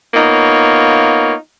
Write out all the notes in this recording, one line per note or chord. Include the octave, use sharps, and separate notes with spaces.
A#3 B3 D#4 F4 C#5